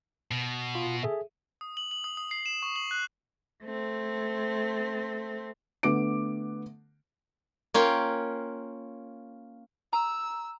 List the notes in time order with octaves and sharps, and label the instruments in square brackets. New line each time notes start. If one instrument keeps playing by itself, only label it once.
[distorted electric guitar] B2
[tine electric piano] F4
G#4 A4 E5
[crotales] D#6
F#7
F#7
D#6
D#6
C7
E7
C#6
F#7
F#6
[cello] A3 C4
[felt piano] D3 A3 B3 D6 D7
[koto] A#3 C#4 F4 G5
[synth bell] A#5 [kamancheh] E6